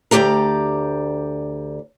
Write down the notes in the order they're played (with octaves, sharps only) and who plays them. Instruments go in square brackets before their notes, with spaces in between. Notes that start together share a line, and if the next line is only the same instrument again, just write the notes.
[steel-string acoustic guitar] D2 E3 G4 D5 A#5